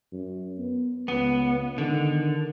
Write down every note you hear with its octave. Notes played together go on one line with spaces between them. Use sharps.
F#2
B3
C#2 B3
D3 D#3